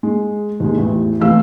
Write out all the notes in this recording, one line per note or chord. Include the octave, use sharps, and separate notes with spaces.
G#3
D#2 G#3
A1 E2 E3
F1 E2 A3 G4 F5 E6